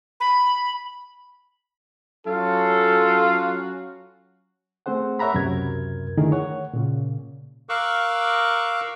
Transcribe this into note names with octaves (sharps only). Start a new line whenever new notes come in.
B5
F#3 C#4 F4 F#4 A4
A3 C4 G#4 C5 F#5
A#4 C#5 E5 F#5 A#5 B5
C#2 F#2 C3 A#4 G#6
D3 D#3 A3 E4 G#4 A#4
C#5 F#5
A#2 C#3
A#4 F5 C#6 D6 E6 F#6